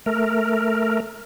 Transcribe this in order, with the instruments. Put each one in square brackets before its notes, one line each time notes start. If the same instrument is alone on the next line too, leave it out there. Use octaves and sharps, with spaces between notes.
[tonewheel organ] A3 A#4